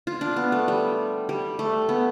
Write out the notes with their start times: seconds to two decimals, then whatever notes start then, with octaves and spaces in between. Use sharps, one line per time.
0.07 F4
0.21 D4
0.36 B3
0.52 A3
0.68 G3
1.29 G3
1.59 A3
1.89 B3